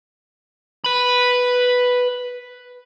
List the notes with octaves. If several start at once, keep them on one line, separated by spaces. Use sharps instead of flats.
B4 B5